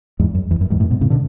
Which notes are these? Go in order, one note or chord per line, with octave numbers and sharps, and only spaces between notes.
E2 G#2
F#2
E2
F#2
E2 G#2
F#2 A2
G#2 B2
A2 C#3
B2 D3